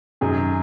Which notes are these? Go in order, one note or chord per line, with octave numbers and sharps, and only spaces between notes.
F#2 D#3 F#3 G#4